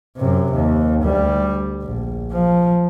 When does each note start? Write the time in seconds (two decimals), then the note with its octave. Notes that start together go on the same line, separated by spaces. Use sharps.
0.17 F#2 C3
0.53 D#2
1.03 D2 G3
1.82 A#1
2.32 F3